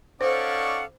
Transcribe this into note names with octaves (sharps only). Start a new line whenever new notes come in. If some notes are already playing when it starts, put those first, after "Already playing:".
C#4 D#4 A4 C5 D5 F5 F#5